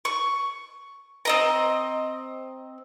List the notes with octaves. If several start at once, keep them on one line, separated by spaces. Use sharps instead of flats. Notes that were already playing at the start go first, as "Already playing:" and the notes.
C#6
C4 D#5 A#5